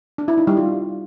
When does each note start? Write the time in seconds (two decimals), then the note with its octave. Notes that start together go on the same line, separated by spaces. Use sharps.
0.18 D4
0.28 E4
0.38 D#4
0.47 G3
0.57 F4